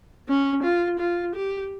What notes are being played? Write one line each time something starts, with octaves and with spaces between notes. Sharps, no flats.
C#4
F4
F4
G4